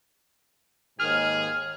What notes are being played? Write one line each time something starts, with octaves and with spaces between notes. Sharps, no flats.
D#2 G#2 D#3 G#4 F6